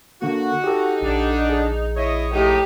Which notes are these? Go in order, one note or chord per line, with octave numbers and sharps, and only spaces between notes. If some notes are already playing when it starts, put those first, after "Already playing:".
D3 A#3 F#4
D#4 G4 A4
A#1 D3 D4
G#4
E4 C#5 D#5
A2 D#4 G4